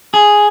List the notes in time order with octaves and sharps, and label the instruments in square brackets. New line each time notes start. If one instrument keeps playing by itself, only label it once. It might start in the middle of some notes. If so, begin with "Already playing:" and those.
[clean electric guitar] G#4